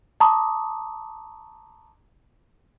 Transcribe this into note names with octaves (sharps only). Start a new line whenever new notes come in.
A5 A#5 C6 D6 D#6